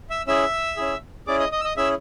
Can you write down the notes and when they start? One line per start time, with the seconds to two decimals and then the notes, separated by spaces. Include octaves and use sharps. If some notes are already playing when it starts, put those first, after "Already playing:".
0.10 E5 E6
0.27 C#4 E4 G#4 E5 E6
0.77 C#4 E4 G#4
1.27 C#4 E4 G#4 D5 D6
1.39 D#5 D#6
1.52 D#5 D#6
1.61 E6
1.64 D#5 D#6
1.77 C#4 E4 G#4 E5 E6